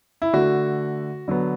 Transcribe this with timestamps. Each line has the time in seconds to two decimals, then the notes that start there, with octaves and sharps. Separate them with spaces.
0.22 E4
0.33 D3 A3 F#4
1.28 D3 F#3 B3